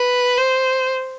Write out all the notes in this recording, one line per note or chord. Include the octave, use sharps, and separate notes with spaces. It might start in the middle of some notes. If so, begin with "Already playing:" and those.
Already playing: B4
C5